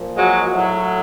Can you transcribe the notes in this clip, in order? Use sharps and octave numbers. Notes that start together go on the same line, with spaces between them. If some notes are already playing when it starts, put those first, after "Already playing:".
Already playing: A#2 F3
F#3 G#3
A2 F#3